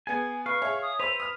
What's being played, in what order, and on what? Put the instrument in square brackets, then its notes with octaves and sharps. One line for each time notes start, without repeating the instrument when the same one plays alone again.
[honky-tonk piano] B3 G#4 [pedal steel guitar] G#5
[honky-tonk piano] B4 [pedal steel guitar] F5 [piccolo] C#6
[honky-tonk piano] G#4 C#5 E5
[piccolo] D#6
[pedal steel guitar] B4 [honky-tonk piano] C5 E6 [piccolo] F7
[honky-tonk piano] D#6 F6